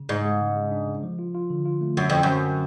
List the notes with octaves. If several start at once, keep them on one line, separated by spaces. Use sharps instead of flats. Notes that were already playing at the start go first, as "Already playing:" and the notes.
Already playing: C#3
G#2 G#3
G#3
C#3
C#3
D4
C#3
F3
F4
F4
D3
F4
A3
F#2 D3
F2 C#4
F#2
C#4
D3